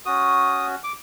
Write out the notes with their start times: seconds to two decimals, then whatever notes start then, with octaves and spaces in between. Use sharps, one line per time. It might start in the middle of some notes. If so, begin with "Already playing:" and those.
0.06 C#4 F#4 D#6
0.84 D6